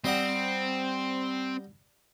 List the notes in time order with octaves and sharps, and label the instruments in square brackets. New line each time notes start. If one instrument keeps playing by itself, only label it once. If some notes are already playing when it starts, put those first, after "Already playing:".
[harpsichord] G3 D#5 F#5 [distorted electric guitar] C4